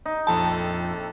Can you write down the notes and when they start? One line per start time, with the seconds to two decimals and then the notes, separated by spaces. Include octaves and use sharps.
0.06 D#4
0.27 A#1 F2 F3 A4 G5 A5 B5